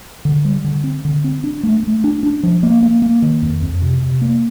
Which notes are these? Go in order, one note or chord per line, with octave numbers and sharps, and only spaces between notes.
D3
G3
D3
C4
D3
C4
D4
A3
A3
D4
D4
F3
A#3
A#3
A#3
D#3
F2
F2
C3
C3
A#3